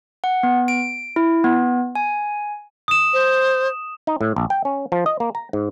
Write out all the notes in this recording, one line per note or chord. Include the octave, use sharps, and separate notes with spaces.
F#5
B3
D7
E4
B3
G#5
D#6 E7
C5
D#4
A2
A#1
G5
C#4
F3
D#5
A#3
A#5
G#2